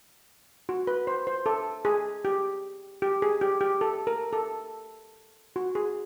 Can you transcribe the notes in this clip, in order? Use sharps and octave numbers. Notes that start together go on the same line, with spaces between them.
F#4
B4
C5
C5
A4
G#4
G4
G4
G#4
G4
G4
A4
A#4
A4
F#4
G#4